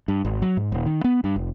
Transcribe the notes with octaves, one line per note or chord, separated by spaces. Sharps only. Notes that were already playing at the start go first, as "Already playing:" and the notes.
G2
G#1
F#3
G#2
D#1
D#3
B3
G2
F1